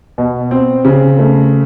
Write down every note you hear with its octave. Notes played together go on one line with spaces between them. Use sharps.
B2
C4
C#3
A3